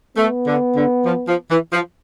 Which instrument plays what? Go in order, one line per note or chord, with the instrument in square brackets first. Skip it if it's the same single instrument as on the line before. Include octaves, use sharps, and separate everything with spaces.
[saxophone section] A3 [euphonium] B3
[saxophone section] D3
D3
F3
F3
E3
F3